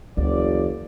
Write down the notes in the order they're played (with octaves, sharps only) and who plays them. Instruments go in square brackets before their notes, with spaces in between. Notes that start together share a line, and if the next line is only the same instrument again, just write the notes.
[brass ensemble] F#1 D5 [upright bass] D2 E3